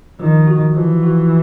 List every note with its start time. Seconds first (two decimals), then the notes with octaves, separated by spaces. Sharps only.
0.19 D#3 F3
0.47 F#4
0.75 E3 F3
1.03 F#4